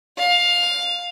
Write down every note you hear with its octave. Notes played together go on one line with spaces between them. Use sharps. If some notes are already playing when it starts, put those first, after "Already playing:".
F5